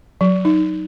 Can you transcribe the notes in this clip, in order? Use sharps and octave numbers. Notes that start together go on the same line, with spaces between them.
F#3
D#4